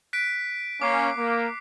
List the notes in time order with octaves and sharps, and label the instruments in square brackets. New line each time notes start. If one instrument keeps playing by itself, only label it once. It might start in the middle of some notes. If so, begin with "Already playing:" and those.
[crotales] F#6 B6 D7
[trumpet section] A#3 C#4 [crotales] D6 C7
[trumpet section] A#3